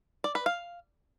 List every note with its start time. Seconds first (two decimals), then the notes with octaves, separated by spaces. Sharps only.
0.24 D5
0.35 B4
0.46 F5